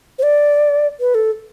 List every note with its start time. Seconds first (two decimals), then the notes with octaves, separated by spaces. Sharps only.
0.19 C5
0.23 D5
1.00 B4
1.15 A4